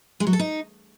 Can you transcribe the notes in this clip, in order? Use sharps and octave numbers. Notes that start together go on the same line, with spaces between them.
G#3
F#3
A4
D#4